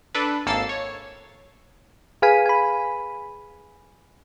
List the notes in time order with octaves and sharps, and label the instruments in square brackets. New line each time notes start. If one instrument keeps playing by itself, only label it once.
[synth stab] D4 A4 B4
G#1 A#3 A4 E6 A6 C7
C#5
[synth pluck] G#4 B4 F5 G#5 B6 D#7
G#5 B5